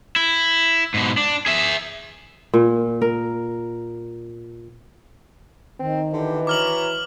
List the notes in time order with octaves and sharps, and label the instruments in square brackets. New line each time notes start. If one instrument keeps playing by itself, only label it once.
[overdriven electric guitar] E4
G#2 B2
D4
G#4 E5
[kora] A#2
A#4
[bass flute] D#3 [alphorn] C4
[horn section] D3 G4 [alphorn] E3
[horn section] F#4 C#5 A#5 [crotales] D6 F6 F#7